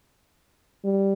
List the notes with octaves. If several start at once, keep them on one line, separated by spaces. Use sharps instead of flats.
G3